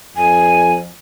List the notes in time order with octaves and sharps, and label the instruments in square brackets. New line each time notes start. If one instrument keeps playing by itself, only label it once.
[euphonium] F2 [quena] G#5